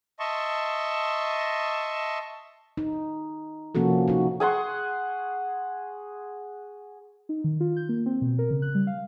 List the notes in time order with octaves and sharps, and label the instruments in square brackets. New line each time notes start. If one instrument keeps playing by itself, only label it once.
[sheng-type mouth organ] D#5 E5 A5 C6 C#6
[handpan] D#4
C3 F3 A#3 C#4 F#4 A4
D#4 F#4
[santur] G#4 F#5 C6 C#6
[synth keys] D#4
D#3
F4
G6
A#3
C4
B2
A#4
C#3
F#6
G3
F5